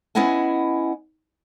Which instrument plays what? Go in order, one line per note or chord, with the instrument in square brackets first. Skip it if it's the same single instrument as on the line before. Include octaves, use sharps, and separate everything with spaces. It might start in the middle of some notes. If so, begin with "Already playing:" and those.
[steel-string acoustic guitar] B3 C#4 E4 D#5 F#5 G#5